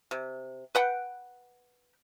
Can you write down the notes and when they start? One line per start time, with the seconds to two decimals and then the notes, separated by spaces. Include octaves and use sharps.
0.11 C3
0.75 B4 F#5 G5